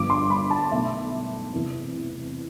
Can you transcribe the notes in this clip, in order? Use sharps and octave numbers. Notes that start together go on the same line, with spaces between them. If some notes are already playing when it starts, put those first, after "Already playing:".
Already playing: G1 G2 F3 D6
C6
B5
A5
B1 B2 A3 E5
E2 C3 E3